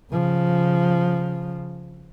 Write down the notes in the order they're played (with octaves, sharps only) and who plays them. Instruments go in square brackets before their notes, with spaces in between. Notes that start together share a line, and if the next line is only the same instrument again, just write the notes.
[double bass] C#3 F3